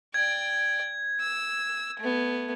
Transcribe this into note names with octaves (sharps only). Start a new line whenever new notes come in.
D5 G5 G#6
E6
A3 B3